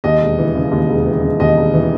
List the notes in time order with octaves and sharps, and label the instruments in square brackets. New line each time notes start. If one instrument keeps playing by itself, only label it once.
[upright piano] D#2 D#5
E1
E3
C#3
D#2
E1
E3
C#3
D#2 D#5
E1
E3